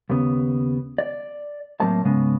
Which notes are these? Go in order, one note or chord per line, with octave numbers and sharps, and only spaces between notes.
D#2 C#3 B3
D5
A2 F#3 A#3 C4 C5 A5
G#2 C#3 G#3 B3